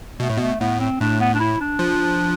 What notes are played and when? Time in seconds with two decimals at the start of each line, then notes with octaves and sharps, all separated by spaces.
0.20 B2 A3
0.29 A2
0.37 B2 A3
0.60 A2 B3
0.80 C4
1.00 A2 D4
1.20 B3
1.34 D4
1.40 E4
1.60 D4
1.79 F3